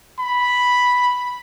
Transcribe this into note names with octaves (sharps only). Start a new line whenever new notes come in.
B5